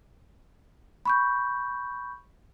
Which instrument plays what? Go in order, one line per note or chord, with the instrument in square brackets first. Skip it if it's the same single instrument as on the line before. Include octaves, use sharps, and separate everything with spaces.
[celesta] B5 C#6 G6